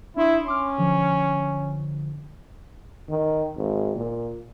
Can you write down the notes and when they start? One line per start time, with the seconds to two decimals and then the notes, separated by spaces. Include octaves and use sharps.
0.17 D4 E4 C6 D#6
0.46 C#4 C6 D6 F6
0.78 D3 F3
3.09 D#3
3.56 G#1
3.96 A#2